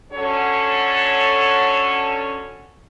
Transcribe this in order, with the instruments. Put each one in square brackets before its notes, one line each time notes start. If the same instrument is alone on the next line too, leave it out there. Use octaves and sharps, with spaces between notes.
[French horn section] D3 F#3 C#4 A4 C#5